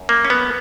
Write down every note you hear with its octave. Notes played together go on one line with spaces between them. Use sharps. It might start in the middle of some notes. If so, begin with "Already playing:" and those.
Already playing: F#2
A#3
C#4
B3